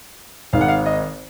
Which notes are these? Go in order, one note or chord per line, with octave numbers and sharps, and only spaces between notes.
G#1 G#2 D#3 F5
F#5
F5
D#5